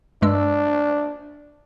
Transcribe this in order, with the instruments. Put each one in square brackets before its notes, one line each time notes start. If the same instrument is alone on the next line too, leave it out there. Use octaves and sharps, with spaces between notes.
[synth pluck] G2 G#3 E6 [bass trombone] D4